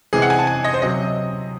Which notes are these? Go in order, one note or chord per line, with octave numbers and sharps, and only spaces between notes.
C3 E3 G#3 G#4
F#5
G#5
A5
G#5
D#5
C5
C3 F#3 C4 D#5